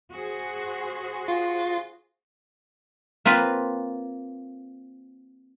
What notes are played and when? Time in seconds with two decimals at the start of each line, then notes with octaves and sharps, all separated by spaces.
0.12 F#4 G#4 C5
1.28 F4
3.25 A#3 C4 F4 B4